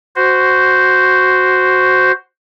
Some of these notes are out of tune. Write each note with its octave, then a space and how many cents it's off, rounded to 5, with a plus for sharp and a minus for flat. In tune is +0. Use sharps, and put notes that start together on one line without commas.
F#4 +0 C5 -5